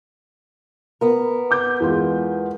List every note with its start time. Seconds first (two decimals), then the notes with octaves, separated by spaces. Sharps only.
1.01 B3 A#4
1.51 D6 G6
1.80 E2 G#3 F4